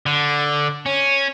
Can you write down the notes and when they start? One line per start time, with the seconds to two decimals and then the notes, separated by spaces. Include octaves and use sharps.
0.06 D3
0.86 C#4